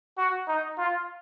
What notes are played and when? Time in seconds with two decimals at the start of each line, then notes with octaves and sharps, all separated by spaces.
0.18 F#4
0.47 D#4
0.78 F4